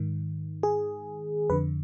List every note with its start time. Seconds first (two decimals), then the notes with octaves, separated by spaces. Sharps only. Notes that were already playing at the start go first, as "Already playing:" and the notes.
Already playing: G#2 D#3
0.63 G#4
1.50 F2 D3 B4